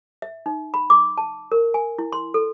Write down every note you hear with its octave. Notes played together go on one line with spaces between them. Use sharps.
E5
D#4
B5
D6
A5
A#4
G#5
E4
C6
A4